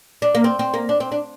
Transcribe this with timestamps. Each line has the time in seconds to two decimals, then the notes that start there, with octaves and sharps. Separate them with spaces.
0.22 D4
0.35 A#3
0.44 C4
0.59 C4
0.74 A#3
0.89 D4
1.00 C4
1.12 D4